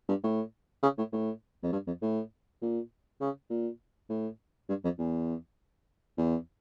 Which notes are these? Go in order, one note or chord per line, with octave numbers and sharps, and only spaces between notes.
G2
A2
C#3
A2
A2
F2
G2
F2
A2
A#2
C#3
A#2
A2
G2
F2
E2
E2